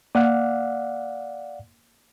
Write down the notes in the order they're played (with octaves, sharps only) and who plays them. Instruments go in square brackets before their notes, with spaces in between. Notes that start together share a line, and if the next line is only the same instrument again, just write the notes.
[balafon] A#3 [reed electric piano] D5 F5 F#5